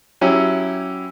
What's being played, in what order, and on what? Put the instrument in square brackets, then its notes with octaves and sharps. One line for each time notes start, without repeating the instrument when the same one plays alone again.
[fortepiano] F#3 C#4 E4 G4